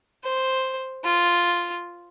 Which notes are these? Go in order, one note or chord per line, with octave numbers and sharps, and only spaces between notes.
C5
F4